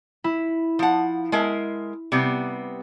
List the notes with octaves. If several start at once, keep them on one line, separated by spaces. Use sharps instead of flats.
E4
F3 F#5
G#3 A#4 E5
C3 G3 B3